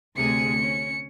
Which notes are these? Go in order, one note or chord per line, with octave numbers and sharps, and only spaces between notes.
D2 C3 G#4 C#7
C#4